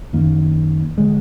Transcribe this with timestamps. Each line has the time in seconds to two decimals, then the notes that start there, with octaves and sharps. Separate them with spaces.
0.13 F#2 D#3 A#3
0.98 D3 G#3